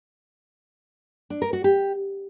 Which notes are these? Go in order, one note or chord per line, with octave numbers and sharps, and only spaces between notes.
D4
A#4
F#4
G4